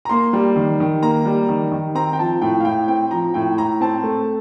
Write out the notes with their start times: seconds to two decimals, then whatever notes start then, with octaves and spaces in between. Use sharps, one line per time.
0.05 A#5
0.09 A#3 C6
0.33 G3
0.56 D#3
0.80 D#3
1.02 A#3 A#5
1.26 G3
1.49 D#3
1.72 D#3
1.95 C4 A#5
2.13 G5
2.19 F3 A5
2.41 A2 G5
2.60 F5
2.65 A2 G5
2.88 C4 G5
3.11 F3 A#5
3.34 A2 G5
3.58 A2 A#5
3.81 C4 A5
4.04 A3